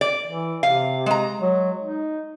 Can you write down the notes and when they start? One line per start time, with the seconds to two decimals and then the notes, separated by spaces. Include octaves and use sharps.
0.01 D5
0.27 E3
0.63 C3 F5
1.06 G#3 A#5
1.40 F#3
1.81 D#4